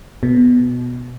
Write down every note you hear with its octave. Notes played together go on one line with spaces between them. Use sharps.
B2